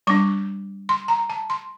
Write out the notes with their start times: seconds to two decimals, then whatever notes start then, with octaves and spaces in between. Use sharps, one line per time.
0.07 G3 D4 D6
0.89 C6
1.08 A#5
1.30 A5
1.50 C6